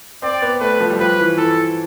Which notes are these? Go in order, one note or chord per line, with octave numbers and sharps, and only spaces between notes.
C4 D5
B3
A3 B4
F3
G3
F3 B4
E3
E3 A4